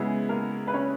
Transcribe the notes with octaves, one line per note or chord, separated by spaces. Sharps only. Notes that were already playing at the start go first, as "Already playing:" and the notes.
Already playing: C#3 G#3 B3 E4 G#4
A#3 A#4
B4
C#4 C#5